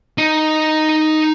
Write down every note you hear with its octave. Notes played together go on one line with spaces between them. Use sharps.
D#4